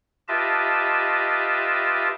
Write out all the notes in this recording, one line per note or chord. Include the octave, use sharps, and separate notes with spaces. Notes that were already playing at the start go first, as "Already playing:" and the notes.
F4 G4 B4 D#5 E5 A5